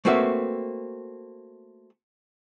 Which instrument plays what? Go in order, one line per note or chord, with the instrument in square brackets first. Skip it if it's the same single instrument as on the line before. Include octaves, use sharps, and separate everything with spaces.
[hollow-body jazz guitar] A3 A#3 C4 F#4 B4 E5